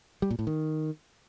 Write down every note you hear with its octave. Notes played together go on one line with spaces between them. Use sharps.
G3
A#2
A2
D#3